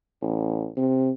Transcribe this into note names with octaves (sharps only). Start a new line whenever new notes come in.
A1
C3